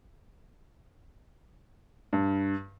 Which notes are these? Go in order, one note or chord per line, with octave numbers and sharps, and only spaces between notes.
G2